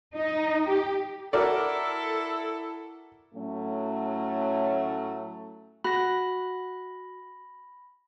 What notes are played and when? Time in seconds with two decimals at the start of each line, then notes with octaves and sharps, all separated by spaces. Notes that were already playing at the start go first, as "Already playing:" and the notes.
0.14 D#4
0.69 G4
1.33 E4 F#4 A4 A#4 D5
3.34 A2 F#3 A3 C#4
5.84 F#4 B5 A#6